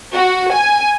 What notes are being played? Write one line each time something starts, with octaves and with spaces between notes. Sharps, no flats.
F#4
G#5